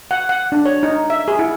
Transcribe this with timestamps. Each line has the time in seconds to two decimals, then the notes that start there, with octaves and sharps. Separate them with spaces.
0.11 F#5
0.29 F#5
0.52 D4
0.66 C#5
0.83 D#4
1.10 E5
1.28 G#4
1.39 E4